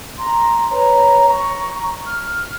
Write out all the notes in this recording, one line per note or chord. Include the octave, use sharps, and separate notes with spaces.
A#5 C6
B4 C#5 A#5
A#5 C#6
F6